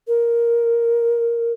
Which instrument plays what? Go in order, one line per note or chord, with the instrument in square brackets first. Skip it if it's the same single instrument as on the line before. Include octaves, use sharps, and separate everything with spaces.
[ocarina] A#4